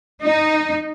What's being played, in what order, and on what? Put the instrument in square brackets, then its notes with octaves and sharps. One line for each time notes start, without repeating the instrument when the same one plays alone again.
[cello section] D#4